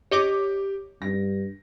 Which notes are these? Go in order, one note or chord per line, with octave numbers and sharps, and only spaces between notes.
G4 C#5 D#5 D6
G2 A#6